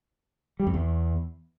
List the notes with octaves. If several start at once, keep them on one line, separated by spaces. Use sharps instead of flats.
G3
F2
E2